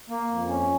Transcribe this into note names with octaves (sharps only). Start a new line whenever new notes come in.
A#3
F2
C#4